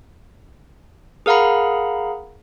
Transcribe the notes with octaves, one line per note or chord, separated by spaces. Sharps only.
G#4 A#4 F5 F#5 A#5 B5